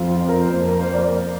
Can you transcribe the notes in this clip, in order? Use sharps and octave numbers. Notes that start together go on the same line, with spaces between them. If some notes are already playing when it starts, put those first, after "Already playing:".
Already playing: F2 F3 C4 F4
F4
A#4
C5
F2 F3 A#3
A#4
C5
D5